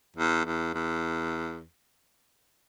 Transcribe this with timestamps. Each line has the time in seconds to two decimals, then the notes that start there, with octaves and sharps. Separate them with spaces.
0.16 E2
0.45 E2
0.74 E2